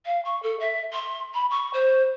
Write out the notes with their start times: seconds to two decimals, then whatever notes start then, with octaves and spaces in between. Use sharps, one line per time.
0.06 F5
0.25 C#6
0.43 A4
0.60 E5
0.93 C6
1.34 B5
1.50 C#6
1.73 C5